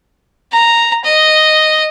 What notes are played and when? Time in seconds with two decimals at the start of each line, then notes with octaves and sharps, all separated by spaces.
0.52 A#5
1.05 D#5